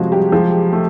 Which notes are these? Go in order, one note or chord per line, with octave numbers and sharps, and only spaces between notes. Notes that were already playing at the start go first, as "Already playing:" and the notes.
Already playing: C3 F3 F#3 G#3 F#4 G#4
G3 G4
F3 G#3 G#4
A3